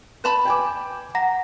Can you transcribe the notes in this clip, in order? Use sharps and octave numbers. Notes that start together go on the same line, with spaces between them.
B4 A5 B5
G5 G#5 D6
F#5 A#5 A#6